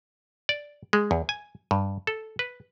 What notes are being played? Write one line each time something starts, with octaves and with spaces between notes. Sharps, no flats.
D5
G#3
E2
G#5
G2
A4
B4